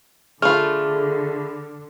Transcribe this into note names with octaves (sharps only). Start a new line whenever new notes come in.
D3 A3 F4 G#4 B5 F6